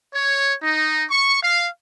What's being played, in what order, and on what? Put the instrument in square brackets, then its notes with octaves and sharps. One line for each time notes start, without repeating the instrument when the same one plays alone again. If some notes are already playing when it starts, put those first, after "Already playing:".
[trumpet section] C#5
D#4
C#6
F5